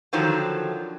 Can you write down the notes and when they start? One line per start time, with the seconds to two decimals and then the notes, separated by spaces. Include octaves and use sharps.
0.13 D3 D#3 F3 F#3